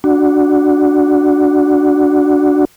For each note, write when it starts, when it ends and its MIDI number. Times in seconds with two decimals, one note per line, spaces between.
0.04 2.65 62
0.04 2.65 66